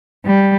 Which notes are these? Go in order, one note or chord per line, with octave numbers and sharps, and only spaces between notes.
G3